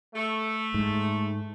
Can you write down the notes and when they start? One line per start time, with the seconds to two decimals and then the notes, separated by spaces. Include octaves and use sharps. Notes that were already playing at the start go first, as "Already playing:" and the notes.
0.14 A3
0.74 G#2